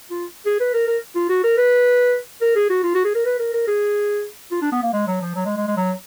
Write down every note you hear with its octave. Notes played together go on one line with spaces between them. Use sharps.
F4
G#4
B4
A#4
A#4
F4
F#4
A#4
B4
A#4
G#4
F#4
F4
F#4
G#4
A#4
B4
A#4
A#4
G#4
F4
D4
B3
A#3
G#3
F#3
F3
F#3
G#3
G#3
G#3
F#3